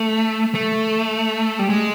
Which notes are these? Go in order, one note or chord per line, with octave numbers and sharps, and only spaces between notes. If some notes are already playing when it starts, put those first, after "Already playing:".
Already playing: A3
A3
G3
G#3